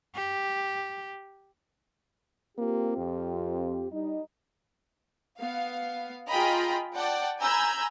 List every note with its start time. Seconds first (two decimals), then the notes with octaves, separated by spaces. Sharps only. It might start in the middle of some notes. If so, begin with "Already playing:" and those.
0.16 G4
2.58 A#3 C4 F4 G4
2.98 F2
3.91 G3 D#4
5.38 B3 F5
6.28 F4 G#4 D#5 G5 A#5 B5
6.94 D5 F#5 G5 A5
7.39 G#5 A#5 B5 E6 G6 G#6